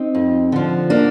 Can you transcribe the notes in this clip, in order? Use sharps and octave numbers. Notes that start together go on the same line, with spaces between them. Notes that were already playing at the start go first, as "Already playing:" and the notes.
Already playing: C4 D#4
F2
D3 F3
A#3 D4